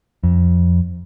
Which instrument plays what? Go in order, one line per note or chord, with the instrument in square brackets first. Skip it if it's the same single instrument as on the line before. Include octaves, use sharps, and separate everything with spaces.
[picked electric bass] F2